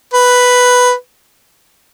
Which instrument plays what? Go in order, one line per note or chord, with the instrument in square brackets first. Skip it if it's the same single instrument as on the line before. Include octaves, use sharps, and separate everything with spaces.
[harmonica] B4